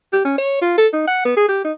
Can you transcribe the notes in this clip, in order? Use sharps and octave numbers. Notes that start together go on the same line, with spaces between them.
G4
C#4
C#5
F4
A4
D#4
F#5
B3
G#4
G4
D#4